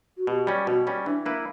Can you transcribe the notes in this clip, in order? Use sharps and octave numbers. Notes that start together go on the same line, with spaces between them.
F#4
B2 G4
G3 C#4
B2 F#4
G3 C#4
E3 D4
A#3 E4 B4